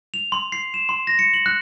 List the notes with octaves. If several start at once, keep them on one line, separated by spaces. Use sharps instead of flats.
F7
C6
C7
E7
C6
A#6
C#7
F#7
F#6